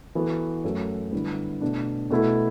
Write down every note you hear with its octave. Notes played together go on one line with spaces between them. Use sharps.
E3 B3 F#4 A4
F#2 F#3 A3
D3 G3 B3 E4
B2 A3 D4
B2 A3 E4 A4